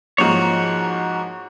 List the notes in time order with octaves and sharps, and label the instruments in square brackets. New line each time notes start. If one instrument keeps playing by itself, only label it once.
[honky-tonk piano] G#2 F3 A#3 [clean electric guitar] F#4 C#5